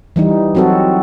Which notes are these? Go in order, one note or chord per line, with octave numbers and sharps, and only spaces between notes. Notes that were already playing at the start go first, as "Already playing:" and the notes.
E3 G3 D#4
F#3 C4 F#4 A4